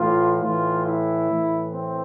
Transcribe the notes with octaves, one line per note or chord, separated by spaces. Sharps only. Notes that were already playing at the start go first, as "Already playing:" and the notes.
Already playing: A2 E3 F4
A2 E3 F4
E4
A2 E3
C4